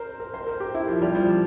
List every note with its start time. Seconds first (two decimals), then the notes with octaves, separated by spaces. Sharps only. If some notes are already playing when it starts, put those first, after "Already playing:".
Already playing: A#4 C5
0.20 A#4
0.34 C5
0.47 A#4
0.60 G4
0.75 E4
0.88 F3
1.02 G3
1.15 F3